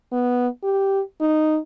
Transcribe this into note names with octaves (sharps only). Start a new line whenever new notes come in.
B3
G4
D#4